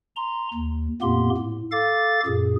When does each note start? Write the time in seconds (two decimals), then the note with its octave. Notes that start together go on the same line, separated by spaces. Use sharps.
0.16 A#5 C6
0.54 D#2
1.02 F2 A#2 A#3 B3 G4 C6
1.37 A2
1.72 A4 F5 D6 A6
2.26 F#2 A#2 G#4